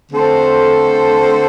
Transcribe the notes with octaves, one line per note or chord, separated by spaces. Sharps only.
D3 A3 C4 A4 C5